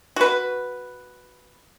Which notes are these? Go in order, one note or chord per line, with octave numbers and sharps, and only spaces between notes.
F#4 B4